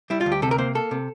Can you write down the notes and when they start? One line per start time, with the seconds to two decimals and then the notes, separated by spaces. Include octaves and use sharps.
0.10 G3 E4
0.21 F4
0.26 D2
0.32 G4
0.42 C3 A4
0.51 A#4
0.58 A#3 C5
0.75 A#3 A4
0.91 C3